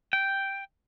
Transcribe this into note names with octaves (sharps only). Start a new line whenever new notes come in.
G5